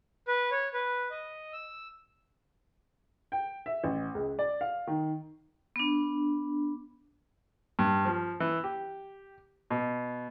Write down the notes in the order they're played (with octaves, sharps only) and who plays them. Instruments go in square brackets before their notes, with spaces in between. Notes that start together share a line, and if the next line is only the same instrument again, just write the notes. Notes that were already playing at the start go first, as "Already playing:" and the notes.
[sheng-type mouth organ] B4
C#5
B4
D#5
E6
[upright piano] G5
E5
A1
C#2
D5
F5
D#3
[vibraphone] B3 D4
[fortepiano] G2
F3
E3
G4
B2